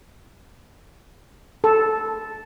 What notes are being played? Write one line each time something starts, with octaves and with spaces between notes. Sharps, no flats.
A4